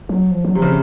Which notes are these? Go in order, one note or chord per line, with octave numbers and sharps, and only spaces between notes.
F#3
F3
F#3
C3 F3
C#3